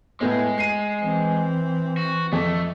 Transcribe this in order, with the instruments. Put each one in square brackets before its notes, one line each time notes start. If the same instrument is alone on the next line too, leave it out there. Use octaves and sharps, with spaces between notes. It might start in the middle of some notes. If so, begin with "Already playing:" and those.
[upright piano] A2 A3 B3 [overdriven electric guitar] G#3
[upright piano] C7 D#7
[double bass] E3 C4
[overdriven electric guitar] F#4
[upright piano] F2 [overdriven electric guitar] A3